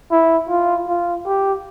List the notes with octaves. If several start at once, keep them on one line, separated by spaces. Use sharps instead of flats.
E4
F4
F4
G4